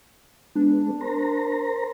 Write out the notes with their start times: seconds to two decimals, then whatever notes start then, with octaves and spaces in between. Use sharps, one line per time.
0.55 G#3 B3 D4
1.01 A#4 C5 A#5